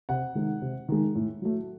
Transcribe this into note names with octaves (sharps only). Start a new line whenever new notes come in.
C3 F#5
D#3 G#3
C3
D#3 G#3
A2
F#3 A3